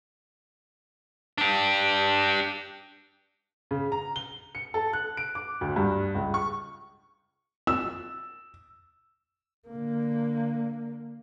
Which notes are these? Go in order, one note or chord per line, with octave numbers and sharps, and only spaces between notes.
D4 G4
C#3
A#5
G7
C#7
A4
F#6
D7
D6
D2
G2
C#2
C#6
E6
D3 A#3